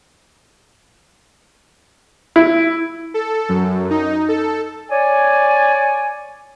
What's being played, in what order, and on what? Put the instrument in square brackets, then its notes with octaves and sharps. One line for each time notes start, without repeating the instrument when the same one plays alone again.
[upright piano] E4
[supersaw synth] A4
F#2
D#4
A4
[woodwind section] C#5 D5 G#5